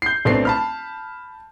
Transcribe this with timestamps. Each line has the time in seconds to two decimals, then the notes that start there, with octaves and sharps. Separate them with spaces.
0.02 G6 C7
0.25 B1 A3 B3 C4 D4 C7
0.45 A5 B5 F6